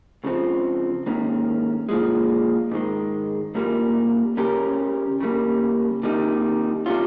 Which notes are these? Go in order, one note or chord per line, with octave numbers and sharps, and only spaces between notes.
C#2 C#3 F3 C4
G#2 D#3 A#3 C#4
A#2 F3 G#3
G#2 D#3 G#3
C2 A#2 G3 A#3
C#3 G3 C#4 G4 A#4
C#3 G3 A#3
C3 D#3 G3 A#3 D#4
C3 G3 C#4 F4